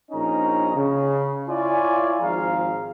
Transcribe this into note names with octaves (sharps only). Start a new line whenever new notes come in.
A#1 C#4 D#4 A#4 D#5 A#5
C#3
E4 F4 C#5 D5 G#5
G#1 F3 G#4 F5 A#5